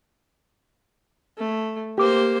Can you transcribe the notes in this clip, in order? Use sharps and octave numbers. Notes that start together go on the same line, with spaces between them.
A3
A#3 G4 C5 D6